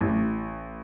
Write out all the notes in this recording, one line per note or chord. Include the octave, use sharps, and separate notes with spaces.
A1